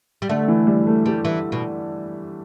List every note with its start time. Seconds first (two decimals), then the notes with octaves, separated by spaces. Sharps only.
0.22 G3
0.29 D3 A3
0.48 E3
0.67 G3
0.87 A3
1.06 G3 A3
1.25 E3
1.52 B2